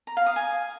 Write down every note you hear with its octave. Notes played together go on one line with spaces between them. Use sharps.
A#5
F5
D#6
G#5